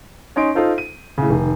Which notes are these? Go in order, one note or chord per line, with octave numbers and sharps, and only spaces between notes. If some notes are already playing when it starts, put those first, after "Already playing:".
C#4 D#4 C6 D7
D#4 F4 A4 C5
D#7
A2 C#3
F1 D#3